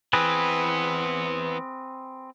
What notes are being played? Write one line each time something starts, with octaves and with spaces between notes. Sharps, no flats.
E3 B3 C4 G#4 B4